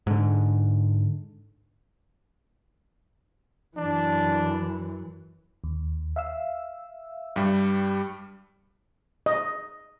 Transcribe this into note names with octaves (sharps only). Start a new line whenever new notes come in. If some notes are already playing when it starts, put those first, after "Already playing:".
G#2 D3
F#2 E3 D4
D#2
E5 F5 E6
G2 G3
D#5